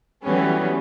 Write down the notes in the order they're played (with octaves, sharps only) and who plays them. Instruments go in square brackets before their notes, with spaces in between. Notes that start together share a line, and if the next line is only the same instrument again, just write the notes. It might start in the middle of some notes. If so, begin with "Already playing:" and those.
[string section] E3 F#3 G3 A3 B3 C#4